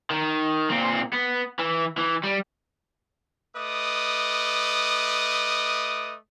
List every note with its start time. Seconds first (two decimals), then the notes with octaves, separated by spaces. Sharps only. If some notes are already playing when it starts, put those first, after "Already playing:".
0.10 D#3
0.70 A#2 C4
1.13 B3
1.59 E3
1.97 E3
2.23 G3
3.56 A3 B4 D#5 D6 D#6